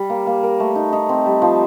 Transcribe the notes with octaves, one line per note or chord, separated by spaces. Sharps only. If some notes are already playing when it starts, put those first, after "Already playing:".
Already playing: G3
A#3
A#3
A#4
A3
D#4
D#4
C4
G3
F3